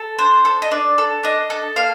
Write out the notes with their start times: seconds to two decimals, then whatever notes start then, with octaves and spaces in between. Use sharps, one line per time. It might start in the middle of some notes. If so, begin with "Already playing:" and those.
Already playing: A4
0.18 D4 C5
0.45 A4
0.62 D#5
0.71 D4 D5
0.98 A4
1.23 D4 D#5
1.50 A4
1.76 A#3 F5